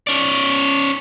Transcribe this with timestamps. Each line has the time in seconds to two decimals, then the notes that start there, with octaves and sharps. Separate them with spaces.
0.07 C#4 D5